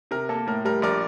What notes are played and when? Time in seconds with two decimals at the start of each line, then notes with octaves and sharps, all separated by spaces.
0.11 C3 A#4
0.29 A#3 A4
0.47 A2 A#4
0.65 G3 A#4
0.82 A#1 A#4 D5